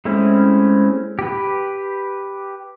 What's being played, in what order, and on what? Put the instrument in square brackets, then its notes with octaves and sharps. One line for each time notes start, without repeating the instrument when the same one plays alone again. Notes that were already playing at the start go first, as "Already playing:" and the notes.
[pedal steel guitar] G#3 A3 C4 C#4 E4
G4 B4